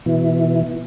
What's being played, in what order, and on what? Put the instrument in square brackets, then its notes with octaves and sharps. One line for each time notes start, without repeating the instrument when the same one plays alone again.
[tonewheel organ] B2 E3